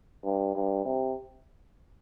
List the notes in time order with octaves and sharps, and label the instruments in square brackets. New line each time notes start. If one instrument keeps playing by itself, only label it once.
[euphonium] G2
G2
C3